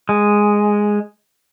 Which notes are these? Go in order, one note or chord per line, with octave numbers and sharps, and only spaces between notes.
G#3